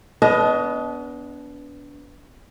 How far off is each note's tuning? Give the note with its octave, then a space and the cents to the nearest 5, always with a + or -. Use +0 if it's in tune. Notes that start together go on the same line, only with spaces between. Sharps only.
B3 +0 D4 -30 D#5 +15